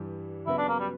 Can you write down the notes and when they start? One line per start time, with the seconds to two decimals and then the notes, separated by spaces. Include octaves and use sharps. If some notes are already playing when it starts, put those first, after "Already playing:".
Already playing: G2 E3 G3
0.47 C#3 F#3 B3 E4 F#4 B4
0.58 D4
0.68 A#3
0.80 G3